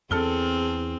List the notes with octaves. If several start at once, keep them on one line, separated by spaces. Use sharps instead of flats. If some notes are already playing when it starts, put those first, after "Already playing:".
E2 C4 G#4 A4 F6 G7